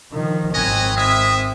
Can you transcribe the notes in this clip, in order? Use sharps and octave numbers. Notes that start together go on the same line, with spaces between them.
D#3 F3
G#1 C4 B4 C#5 D#5 G#5
G#3 E5 D#6